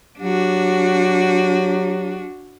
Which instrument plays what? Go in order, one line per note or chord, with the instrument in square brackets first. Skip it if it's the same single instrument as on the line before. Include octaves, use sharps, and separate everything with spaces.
[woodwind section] F#3 G4 [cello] D4 F#4